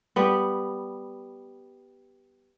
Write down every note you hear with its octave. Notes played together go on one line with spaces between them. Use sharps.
G3 B3